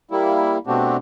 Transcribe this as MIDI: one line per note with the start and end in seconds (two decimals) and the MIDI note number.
0.11 0.58 55
0.11 0.58 58
0.11 0.58 64
0.67 0.97 47
0.67 0.97 57
0.67 0.97 60
0.67 0.97 62
0.67 0.97 66
0.67 0.97 67